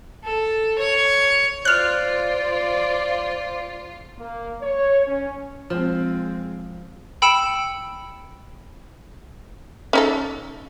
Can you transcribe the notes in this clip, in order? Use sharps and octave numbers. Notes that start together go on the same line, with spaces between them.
A4
C#5
F4 C5 D5 F6 F#6
A#3
C#5
C#4
F3 G#3 C4
G5 B5 E6 C#7 D7 E7
C#4 D#4 A4